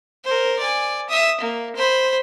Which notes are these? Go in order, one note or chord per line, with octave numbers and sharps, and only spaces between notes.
A#4 C5
D5 G#5
E5 D#6
A#3
C5 B5